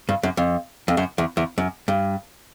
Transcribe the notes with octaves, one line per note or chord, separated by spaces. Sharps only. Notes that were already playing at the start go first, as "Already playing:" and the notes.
G2
F#2
F2
F2
F#2
E2
E2
F#2
G2